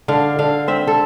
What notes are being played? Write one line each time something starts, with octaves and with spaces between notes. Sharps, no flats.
D3 F5
D3 F5
C4 E5
A4